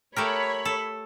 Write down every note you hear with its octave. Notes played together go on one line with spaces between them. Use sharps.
A3 G4 A#4 C#5 B5
A4